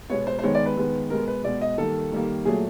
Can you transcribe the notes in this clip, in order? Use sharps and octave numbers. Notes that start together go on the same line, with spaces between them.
B2 G#3 B3 C#5
C5
C5
D#3 G#3 B3 C#5
D5
B4
D#3 G#3 B3
B2 G#3 B3 A#4
B4
B2 G#3 B3 D5
D#5
D#3 G3 A#3 A4
D#3 G3 A#3
A#2 F#3 A3 G#4